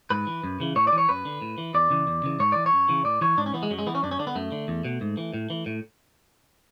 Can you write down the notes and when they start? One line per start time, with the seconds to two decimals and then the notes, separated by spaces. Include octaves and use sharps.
0.10 G#2 B4
0.27 E3
0.44 F#2
0.60 C#3 E3
0.76 A2 C#5
0.87 D5
0.93 E3
0.98 C#5
1.09 F#2 B4
1.25 D3
1.42 A2
1.58 E3
1.74 E2 D5
1.90 C#3 E3
2.07 E2
2.23 C#3 E3
2.39 G#2 C#5
2.52 E3 D5
2.66 C#5
2.73 F#2
2.89 C#3 E3
3.05 A2 D5
3.21 E3 C#5
3.38 G#2 D4
3.46 C#4
3.54 E3 B3
3.63 G#3
3.70 F#2 F#3
3.79 G#3
3.87 E3 B3
3.95 C#4
4.03 F#2 D4
4.11 C#4
4.19 D3 D4
4.27 B3
4.35 F#2 A3
4.52 D3
4.68 E2
4.85 B2
5.01 G#2
5.17 E3
5.34 A2
5.50 E3
5.66 A2